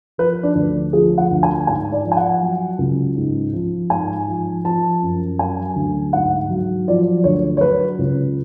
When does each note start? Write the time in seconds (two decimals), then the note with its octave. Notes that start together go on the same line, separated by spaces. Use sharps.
0.18 F3 B4
0.43 D4
0.55 D2
0.93 F3 G#4
1.18 F#5
1.31 D2
1.43 G#5
1.67 G#2 G#5
1.92 D5
2.05 F3
2.12 G#5
2.17 F#5
2.42 F#3
2.79 C#2
3.16 G#2
3.53 F3
3.90 G#2 G#5
4.28 F3
4.64 F3 A5
5.02 F#2
5.39 F#3 G#5
5.76 D2
6.13 G#2 F#5
6.50 F#3
6.88 F3 D5
7.24 D2 C#5
7.57 C#5
7.61 F#3 B4
7.99 C#2